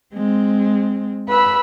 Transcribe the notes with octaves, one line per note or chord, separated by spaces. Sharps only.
G#3 C4
B4 B5 E6